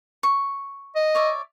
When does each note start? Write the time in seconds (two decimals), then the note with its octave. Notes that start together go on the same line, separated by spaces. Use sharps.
0.23 C#6
0.96 D#5
1.15 C#5 D5 E5